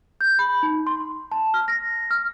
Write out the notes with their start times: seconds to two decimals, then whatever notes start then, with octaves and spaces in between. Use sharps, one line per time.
0.21 G6
0.39 B5
0.63 D#4
0.87 C6
1.32 A5
1.54 F6
1.68 A#6
2.11 F6